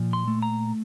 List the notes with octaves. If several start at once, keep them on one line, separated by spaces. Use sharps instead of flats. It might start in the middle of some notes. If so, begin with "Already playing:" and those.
Already playing: A#2 F3
C6
A3
A#5